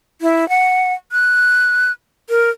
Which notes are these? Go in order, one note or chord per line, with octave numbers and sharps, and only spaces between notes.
E4
F#5
F#6
A#4